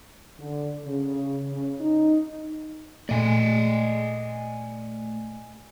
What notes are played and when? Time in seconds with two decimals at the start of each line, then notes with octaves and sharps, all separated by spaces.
0.39 D3
0.85 C#3
1.50 C#3
1.81 D#4
3.09 A#2 A3 D5 D#5 G#5